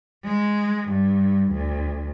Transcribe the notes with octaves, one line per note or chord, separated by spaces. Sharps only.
G#3
G2
D2